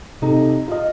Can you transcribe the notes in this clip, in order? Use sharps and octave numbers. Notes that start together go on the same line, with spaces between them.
C3 D#4 A4
F4 D#5